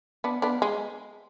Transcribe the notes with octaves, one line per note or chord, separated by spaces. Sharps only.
B3 D4
B3 D4
G#3